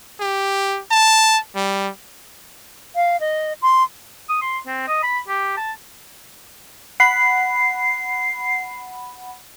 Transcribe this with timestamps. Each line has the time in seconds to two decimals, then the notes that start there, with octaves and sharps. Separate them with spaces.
0.20 G4
0.91 A5
1.55 G3
2.96 F5
3.20 D#5
3.62 C6
4.29 D#6
4.42 C6
4.67 C4
4.88 D#5
5.03 B5
5.28 G4
5.57 A5
7.00 F#5 B5 C7